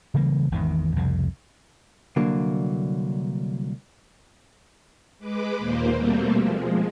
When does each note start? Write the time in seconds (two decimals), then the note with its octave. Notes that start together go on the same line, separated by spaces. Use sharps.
0.14 C#3 E3 G3 A#3
0.52 G#1 E2 G#2 D#3
0.96 C2 F2 C#3
2.16 C2 D3 F#3 A#3
5.19 G#3 B4 D6
5.58 D#2 A#2 A#3 C5
5.95 B2 G3 A3 A#3 C4
6.36 F3 G#3